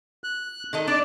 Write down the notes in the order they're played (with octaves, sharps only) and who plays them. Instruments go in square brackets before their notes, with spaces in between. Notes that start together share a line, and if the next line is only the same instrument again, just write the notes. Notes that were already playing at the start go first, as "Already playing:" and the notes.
[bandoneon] F#6
[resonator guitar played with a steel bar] D#3 A4 D#5
[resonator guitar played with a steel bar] D4 [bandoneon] D5